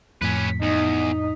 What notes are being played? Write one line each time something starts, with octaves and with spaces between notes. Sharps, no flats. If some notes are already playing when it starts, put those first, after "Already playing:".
F2 A2 C#4 B4 B6
E2 D#4